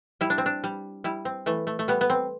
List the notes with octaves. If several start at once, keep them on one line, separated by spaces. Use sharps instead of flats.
G3 E4
D4
C4
D4
G3
G3 E4
C4
E3 A3
A3
A3
G3 B3
B3
C4